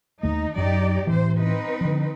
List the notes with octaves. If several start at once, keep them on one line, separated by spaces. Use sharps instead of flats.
D#2 A3 D#4
F#2 F#3 D#4 G4 D5
A2 C3 E3 C5
C4 D#4 B4
D3 F3